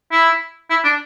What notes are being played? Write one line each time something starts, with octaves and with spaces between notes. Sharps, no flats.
E4
E4
D4